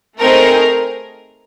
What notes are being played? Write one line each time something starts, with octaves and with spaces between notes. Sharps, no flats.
A3 C4 D#4 G#4 A#4